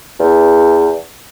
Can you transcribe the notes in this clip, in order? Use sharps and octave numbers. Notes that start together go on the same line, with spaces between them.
E2